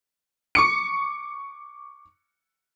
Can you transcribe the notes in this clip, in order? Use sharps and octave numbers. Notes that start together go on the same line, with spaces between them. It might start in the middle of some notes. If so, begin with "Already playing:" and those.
C#6 D6 C#7